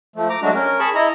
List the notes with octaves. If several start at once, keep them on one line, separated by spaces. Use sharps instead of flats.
F3 A3
A#5 D6
F#3 G#3 A3 D4 F#4
C#4 A#4
G#4 A5 B5 C#6
E4 D#5 A#5